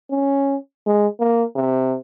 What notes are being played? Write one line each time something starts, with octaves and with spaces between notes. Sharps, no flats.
C#4
G#3
A#3
C3